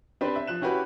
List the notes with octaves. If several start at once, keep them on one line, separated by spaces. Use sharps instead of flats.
C4 D4 G4 B4 C5
E5
F3 F#6 E7
C#4 E4 F#4 G4 B4